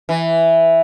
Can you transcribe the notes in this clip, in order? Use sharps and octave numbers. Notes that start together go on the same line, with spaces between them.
E3